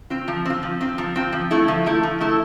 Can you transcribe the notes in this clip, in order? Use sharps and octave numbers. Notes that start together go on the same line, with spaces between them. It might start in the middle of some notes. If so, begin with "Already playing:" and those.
C4 F4
F3
C4 F4
F3
C4 F4
F3
C4 F4
F3
A3 E4 A4
F3
A3 E4 A4
F3
A3 E4 A4